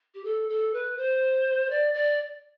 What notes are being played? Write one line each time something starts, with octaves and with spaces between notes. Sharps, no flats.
G4
A4
A4
B4
C5
D5
D5